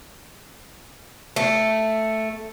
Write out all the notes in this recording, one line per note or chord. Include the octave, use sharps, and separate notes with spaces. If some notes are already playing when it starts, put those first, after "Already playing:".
A3